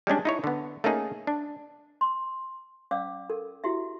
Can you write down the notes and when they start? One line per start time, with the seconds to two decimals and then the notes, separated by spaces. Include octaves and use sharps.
0.07 G3 G#3 C#4 D4
0.25 D#4 E4 C#5
0.44 D3 B3
0.84 A3 A#3 C#4 D#4 G#4
1.27 D4
2.01 C6
2.91 C#4 D5 F5 D6 E6
3.30 A4 A#4
3.64 E4 F#4 G4 E5